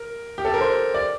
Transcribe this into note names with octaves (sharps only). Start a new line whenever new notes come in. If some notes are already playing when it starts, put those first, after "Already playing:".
Already playing: A#4
G4
A4
A#4
C5
D5